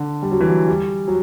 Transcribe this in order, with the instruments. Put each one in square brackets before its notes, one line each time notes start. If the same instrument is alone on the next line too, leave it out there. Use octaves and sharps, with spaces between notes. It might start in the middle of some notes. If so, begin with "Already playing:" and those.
Already playing: [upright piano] D3
G3
F#3
E3
F#3
G3
F#3